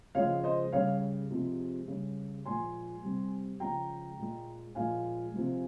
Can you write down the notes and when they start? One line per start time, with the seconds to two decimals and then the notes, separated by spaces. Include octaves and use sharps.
0.15 C#3 F3 G#3 C#5 F5
0.44 C5 D#5
0.73 C#3 G3 C#5 F5
1.31 C3 F3 G#3
1.88 C#3 G3
2.45 A#2 F3 G#3 G#5 C6
3.03 C3 G3
3.60 C#3 F3 G#3 G5 A#5
4.18 A#2 G#3
4.75 A#2 F3 G#3 F5 G#5
5.33 C3 F3 G#3